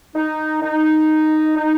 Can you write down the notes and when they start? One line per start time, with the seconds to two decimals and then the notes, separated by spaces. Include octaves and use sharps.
0.15 D#4
0.62 D#4
1.57 D#4